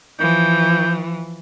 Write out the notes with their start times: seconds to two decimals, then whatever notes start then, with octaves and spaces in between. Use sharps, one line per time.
0.19 E3 F3 G6